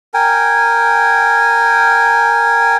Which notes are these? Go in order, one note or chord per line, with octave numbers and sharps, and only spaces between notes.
A#4 G5 G#5